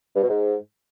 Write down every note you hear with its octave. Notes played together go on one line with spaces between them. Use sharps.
G2
B2
G#2